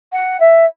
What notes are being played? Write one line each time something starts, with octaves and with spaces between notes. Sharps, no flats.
F#5
E5